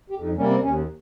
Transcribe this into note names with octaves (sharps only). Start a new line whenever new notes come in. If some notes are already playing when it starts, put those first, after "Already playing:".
F2 G4
D#4
C3 G3 A#3 C#4
C4
D#2 C#4